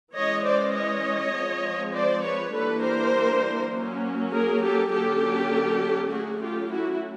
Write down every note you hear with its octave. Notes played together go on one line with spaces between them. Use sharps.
E3 G#3 C#4 C#5 D#5
C5 D5
C#5 D#5
F3 G#3 C4
C5 D5
B4 C#5
E3 G3 A#3 D4 A4 B4
A#4 C5
F#3 A#3 C#4
G#4 A#4
G4 A4
D3 F#3 A#3 C#4 G4 A4
F#3 A3 C#4 F#4 G#4
F4 G4
E4 F#4